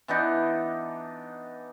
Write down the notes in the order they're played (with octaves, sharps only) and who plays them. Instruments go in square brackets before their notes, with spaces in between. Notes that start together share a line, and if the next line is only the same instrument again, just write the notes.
[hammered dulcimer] E3 B3 D4 D#4